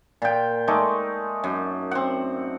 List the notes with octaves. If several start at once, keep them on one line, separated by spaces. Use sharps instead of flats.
A#2 G5
G#3 A3 D#4 D5
F#2
C4 F#5